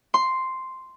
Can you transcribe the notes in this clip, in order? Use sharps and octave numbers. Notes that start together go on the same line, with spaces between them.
C6